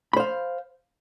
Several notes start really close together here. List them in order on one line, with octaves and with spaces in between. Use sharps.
B5 C5 F5